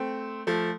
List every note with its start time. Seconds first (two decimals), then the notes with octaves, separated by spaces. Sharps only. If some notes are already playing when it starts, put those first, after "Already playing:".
Already playing: A3 C4
0.47 F3 A3